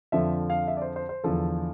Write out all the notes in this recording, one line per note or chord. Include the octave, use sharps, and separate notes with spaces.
F2 D3 F3 E5
F5
E5
D5
C5
C5
C5
E2 D3 F3 A4